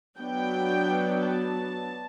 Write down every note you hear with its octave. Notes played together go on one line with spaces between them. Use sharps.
F#3 B3 D4 G5
A5